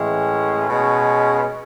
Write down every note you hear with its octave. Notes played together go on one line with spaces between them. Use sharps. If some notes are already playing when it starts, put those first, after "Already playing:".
Already playing: A2 E3 G#3 C#4
B2 G#3 C#4